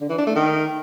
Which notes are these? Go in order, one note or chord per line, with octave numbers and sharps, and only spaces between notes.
D3
E3
D4
A3
D#3